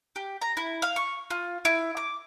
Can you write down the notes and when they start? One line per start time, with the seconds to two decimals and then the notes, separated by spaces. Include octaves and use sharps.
0.16 G4
0.42 A#5
0.57 E4
0.82 F5
0.96 C#6
1.31 F4
1.65 E4
1.97 D6